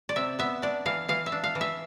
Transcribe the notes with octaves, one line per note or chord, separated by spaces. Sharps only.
D5
C3 E5
B3 E5
D4 D5
E3 F5
E3 F5
E5
D4
F5
E3
E5